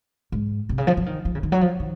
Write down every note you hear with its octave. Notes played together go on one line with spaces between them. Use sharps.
G#2
C3
C#3
F3
F3
D#3
F3
C#3
D#3
F#3
F3
D#3